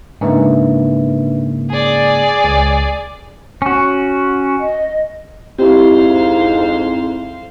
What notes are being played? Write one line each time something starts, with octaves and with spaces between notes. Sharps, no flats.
G#2 C#3 A#3 D4 B4 E5
G#4 D5 G#5
C#2
C#4 F#4
D#5
F2 G#2 C4 E4 G4 C5 F5